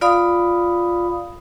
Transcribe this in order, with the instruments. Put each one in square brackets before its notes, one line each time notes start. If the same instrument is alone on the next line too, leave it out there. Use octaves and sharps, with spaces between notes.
[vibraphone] F4 D5 F5 B5 D#6